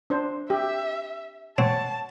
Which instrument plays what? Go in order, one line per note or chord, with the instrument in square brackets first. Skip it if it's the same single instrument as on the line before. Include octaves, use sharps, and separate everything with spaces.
[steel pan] D4 C5
[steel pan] G4 [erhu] E5
[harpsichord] C4 [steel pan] C#5 F#5 [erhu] A5